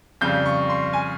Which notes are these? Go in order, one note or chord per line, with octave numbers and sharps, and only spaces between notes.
F2 C#3 G3 G6
C#6
C6
G#5